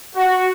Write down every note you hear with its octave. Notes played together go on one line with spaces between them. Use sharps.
F#4